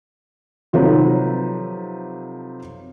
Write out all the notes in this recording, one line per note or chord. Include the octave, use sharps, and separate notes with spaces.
C3 F3 F#3 D#4 A4 B4